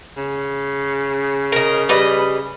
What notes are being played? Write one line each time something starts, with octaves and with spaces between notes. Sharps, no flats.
C#3
A#4 D#5
G3 B4 D#5